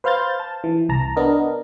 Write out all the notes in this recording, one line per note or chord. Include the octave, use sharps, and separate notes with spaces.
B4 C5 F5 F6 G6 A6
A5
E3
C2 A5 A#5
B3 D4 A#4 D#5